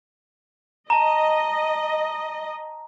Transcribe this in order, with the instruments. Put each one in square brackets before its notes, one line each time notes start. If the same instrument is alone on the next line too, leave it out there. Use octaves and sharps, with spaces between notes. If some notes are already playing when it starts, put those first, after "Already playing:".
[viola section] D#5 [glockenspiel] A5 A#5